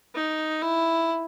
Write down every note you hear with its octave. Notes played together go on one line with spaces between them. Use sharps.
D#4
E4